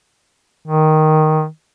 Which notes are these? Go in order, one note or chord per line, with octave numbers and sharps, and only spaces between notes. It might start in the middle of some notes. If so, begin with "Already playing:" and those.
D#3